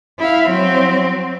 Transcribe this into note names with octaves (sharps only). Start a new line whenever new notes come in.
E4 F5
F#3 C4